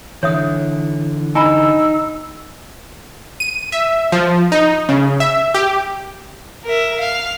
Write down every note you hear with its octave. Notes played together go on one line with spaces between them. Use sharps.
D3 E3 C#5 E5 D#6
D#4 G#5 A#5 B5 E6
D#7
E5
F3
D#4
C#3
E5
G4
A#4 E5
F5